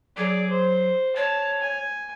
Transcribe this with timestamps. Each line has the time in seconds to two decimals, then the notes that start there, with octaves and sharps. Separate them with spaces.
0.17 F#3 G#4 D5
0.50 C5
1.16 C#5 A5
1.61 G#5